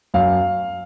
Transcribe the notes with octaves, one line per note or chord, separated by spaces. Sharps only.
F#2 F5